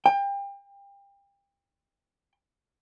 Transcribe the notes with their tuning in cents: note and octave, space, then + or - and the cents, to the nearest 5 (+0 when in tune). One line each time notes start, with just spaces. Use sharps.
G5 +30